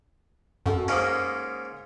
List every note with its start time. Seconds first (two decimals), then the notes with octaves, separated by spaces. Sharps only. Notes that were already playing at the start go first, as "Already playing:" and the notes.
0.66 F#2 F#4 A4
0.88 G#2 A#3 C#4 D#6 G#6